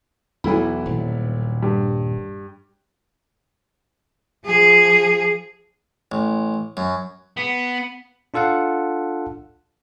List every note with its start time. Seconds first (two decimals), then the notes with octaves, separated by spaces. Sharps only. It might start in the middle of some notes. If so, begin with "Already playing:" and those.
0.44 B1 E2 E3 E4 B5
0.86 D#1
1.63 G2
4.46 F3 G#4
6.12 A1
6.77 F#2
7.37 B3
8.34 D4 F4 A4 F5 F#5